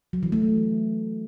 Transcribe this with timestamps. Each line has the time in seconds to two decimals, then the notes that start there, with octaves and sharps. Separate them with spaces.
0.13 F#3
0.23 E3
0.32 A3
0.42 E3